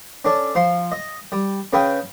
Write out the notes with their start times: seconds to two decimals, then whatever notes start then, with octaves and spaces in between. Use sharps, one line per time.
0.25 C#4 D4 A4
0.55 F3 C6
0.92 D#5
1.32 G3
1.73 C#3 C#4 B4 G5 D#6